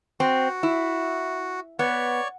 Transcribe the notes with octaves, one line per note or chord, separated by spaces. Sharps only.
C4 F#4
E4
B3 C#5 D5 C#6